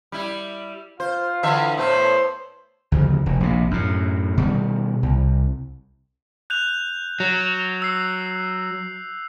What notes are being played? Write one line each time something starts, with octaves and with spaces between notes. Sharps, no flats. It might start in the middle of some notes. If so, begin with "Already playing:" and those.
G3 E4
F4 C5
D3 E3 E5
A2 A3 B3 C5
D2 C#3 F3
F1
A#1 C3
F#2 A2
B2 D#3 G3
C2
F#6 G6 F7
F#3
E6 C7